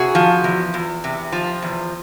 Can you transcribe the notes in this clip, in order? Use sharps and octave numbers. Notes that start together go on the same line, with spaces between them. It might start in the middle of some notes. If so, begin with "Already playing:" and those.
Already playing: C3 F#4 G#4
F3
E2
E2
C3
F3
E2